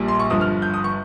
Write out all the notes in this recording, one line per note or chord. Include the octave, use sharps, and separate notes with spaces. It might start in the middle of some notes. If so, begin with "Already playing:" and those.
Already playing: A#1 A#2 G3
C6
C#6
G1 G2 F3 D#6
F6
G6
D#6
C#6